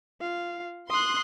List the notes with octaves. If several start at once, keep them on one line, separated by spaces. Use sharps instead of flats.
F4 F5
C6 D#6 F#6